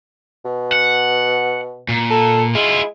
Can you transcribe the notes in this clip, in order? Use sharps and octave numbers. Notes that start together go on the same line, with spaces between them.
B2
F#5
A#2
A4
G#3 E4 F4